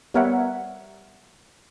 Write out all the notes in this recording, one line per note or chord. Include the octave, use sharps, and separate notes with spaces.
G3 B3 A#4 C#5 E5 F#5